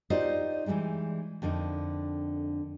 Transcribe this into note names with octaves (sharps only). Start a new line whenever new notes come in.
D#4 F4 G4 C5 D5 D#5
E3 F3 G3 G#3 D#4
F2 D3 A#3 D4 D#4